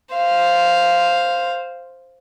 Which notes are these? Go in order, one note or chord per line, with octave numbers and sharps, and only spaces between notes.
C5 F5